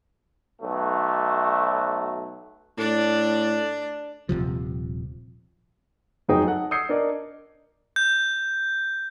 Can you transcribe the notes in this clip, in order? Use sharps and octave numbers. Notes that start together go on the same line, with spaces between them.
B1 F#3 A3
A2 D4 D5
D#1 G#1 C3 F3
F2 F#3 D#4 G#4 G5
A4 F#5
D#6 E6 G6 G#6 C7 C#7
D4 A#4 D5 D#5
G6